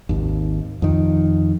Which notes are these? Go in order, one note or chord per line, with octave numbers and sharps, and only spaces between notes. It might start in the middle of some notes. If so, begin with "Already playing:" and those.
G#1 D#2
F2 D#3